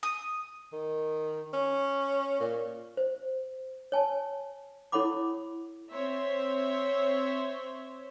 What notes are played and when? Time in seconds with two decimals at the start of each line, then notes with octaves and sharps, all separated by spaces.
0.03 D#6
0.73 D#3
1.54 C#4
2.40 A#2
2.97 C5
3.92 C#5 G#5 A5
4.92 E4 A4 C#5 F#5 B5 D6
5.92 C4 C5 C#5 E5